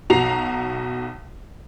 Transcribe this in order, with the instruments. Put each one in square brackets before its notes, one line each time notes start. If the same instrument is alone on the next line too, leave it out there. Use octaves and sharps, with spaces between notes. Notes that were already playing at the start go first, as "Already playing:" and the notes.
[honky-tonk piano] B1 F#4 A#5 C7 F7